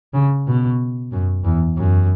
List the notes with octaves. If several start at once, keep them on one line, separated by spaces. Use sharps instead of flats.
C#3
B2
F#2
E2
F#2